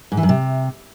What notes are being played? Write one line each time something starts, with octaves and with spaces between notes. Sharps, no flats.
G#2
E3
F#2
C3